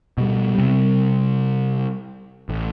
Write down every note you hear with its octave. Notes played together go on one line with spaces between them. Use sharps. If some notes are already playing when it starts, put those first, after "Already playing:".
B2 G3
C3 G3
A1